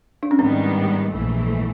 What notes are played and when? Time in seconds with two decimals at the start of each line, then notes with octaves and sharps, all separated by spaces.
0.23 D4
0.31 C#4
0.39 G#2 D#3 G3 B3 C4
1.10 A#1 G#2 E3 A3